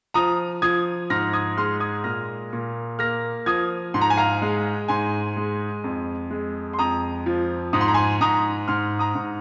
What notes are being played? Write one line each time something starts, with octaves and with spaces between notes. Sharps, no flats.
F3 A#5 D#6
F3 D#6 G#6
G#2 F6 A#6
D#6 G#6
G#3 C6 F6
D#6 G#6
A#2 F6 A#6
A#2
A#3 F6 A#6
F3 D#6 G#6
G#2 C6
A#5
G#5
F5 A#5
G#3
G#2 G#5 C6
G#3
F2
G#3
C6
F2 A#5 D#6
F3
G#2 D#6
C6
A#5
G#5 C6
G#2 A#5 D#6
G#2 C6 F6
A#5 D#6
G#2